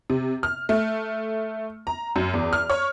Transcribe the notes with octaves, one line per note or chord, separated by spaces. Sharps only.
C3
F6
A3
A#5
F#2
E2
F6
C#5